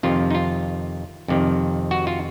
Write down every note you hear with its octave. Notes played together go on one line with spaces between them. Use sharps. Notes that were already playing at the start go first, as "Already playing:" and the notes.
F2 C3 D#3 F4
D#4
F4
F2 C3 D#3
F#4
F4